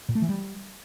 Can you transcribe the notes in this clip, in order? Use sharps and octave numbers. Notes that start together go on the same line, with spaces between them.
A#2
A3
E3
G3